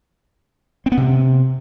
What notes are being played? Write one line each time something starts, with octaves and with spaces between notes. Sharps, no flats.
C4
B3
C3